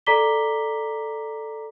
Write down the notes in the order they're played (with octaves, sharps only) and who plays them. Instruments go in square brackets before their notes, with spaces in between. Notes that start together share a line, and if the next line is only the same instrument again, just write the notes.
[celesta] A4 D5 A#5 D6 B6 G7